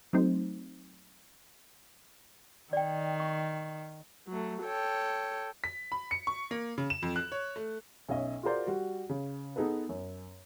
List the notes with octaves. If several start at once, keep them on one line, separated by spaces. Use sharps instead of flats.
F#3 A3 C4 D#4 C5
D#3 D5 G5
C#6
F#3 A3
A4 C#5 G5
B6
B5
C#7
C#6
A#3
C#3
E7
F2
F#6
C#5
A3
B1 C#4 D#5 E5
F4 F#4 G#4 A#4 C5 D5
G3 F#4
C#3
B3 D#4 G#4 A4 B4
F#2